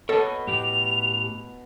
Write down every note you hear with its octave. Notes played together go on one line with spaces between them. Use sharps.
B2 A4 C#5 D#5
A2 G4 F7